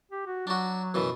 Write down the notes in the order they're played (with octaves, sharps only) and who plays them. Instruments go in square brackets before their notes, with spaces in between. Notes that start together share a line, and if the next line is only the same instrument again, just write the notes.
[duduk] G4
F#4
[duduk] F#3 [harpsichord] D4 F#4
[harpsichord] F#2 B2 E3